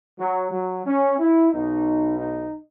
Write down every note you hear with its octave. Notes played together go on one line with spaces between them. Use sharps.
F#3
F#3
C#4
E4
B1 B2 D#4
D#4